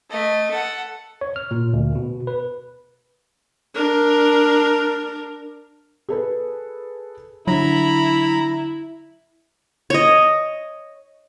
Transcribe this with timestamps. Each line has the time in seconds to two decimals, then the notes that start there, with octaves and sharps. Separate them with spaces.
0.10 A3 D#5
0.51 A4 F#5
1.21 C#5
1.36 F6
1.51 A#2
1.73 D2
1.95 B2
2.27 B4
3.75 D4 A#4
6.09 G#4 A4 B4
7.47 D3 F#3 E4 A#5 B5
9.90 C#5 D#5